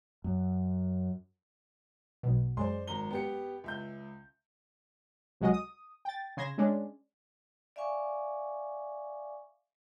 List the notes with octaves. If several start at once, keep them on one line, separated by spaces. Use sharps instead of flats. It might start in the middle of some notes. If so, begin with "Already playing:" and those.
F#2
B1 B2
F#2 G#3 C5 D5 C6
G#1 A#5 G7
B3 G4 C#7
C#2 E5 G6
C2 F#3 G#3 F#4 D#5
D#6
G5 A6
C#3 C6 G#6 A#6 E7
G#3 C#4 D4
D5 E5 F5 G#5 C#6 D6